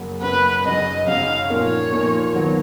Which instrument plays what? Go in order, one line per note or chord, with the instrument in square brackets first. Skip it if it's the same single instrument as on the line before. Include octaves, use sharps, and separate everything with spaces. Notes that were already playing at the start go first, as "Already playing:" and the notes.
Already playing: [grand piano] F#2 C#3 F#3 A#3
[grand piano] F#2 C#3 F#3 A#3 [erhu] B4
[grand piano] F#2 C#3 F#3 [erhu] D#5
[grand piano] F#2 C#3 F#3 [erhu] F5
[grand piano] A#2 F3 A#3 D#4 A#4 [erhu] C#5
[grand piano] A#2 F3 A#3 D#4 A#4
D#3 F#3 B3